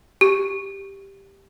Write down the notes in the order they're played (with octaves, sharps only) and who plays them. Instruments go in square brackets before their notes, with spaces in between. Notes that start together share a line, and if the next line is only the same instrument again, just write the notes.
[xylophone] G4